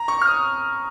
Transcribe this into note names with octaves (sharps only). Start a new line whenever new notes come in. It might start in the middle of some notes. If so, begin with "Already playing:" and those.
Already playing: A#5
C#6
F6
D#6